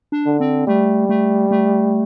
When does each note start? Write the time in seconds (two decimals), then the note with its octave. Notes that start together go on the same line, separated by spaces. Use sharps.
0.12 D4
0.26 D3
0.40 C4
0.67 G3 A3
1.09 A3
1.51 A3